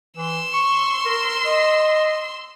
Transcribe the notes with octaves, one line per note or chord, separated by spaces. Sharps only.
E3 C6 E6
C#6
A#4
D#5